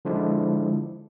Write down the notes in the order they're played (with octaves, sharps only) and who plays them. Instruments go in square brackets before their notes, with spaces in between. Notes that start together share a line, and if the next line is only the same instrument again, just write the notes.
[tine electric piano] D3 F3 G#3 D4 E4